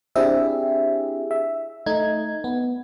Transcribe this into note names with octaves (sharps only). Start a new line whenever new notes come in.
C4 D4 E4 G4 G#4 E5
E5
A3 D#4 G#6
B3